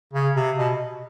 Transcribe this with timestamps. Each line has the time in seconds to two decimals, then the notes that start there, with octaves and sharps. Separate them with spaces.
0.13 C#3
0.36 C3
0.58 B2